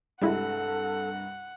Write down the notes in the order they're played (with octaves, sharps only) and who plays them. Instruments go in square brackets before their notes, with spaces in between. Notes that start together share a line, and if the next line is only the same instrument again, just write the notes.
[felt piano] C2 G2 [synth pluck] G3 G#3 E4 [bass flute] A4 [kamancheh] F#5